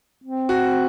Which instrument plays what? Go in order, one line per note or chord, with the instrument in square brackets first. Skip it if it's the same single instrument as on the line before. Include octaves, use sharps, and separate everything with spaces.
[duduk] C4
[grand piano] F#4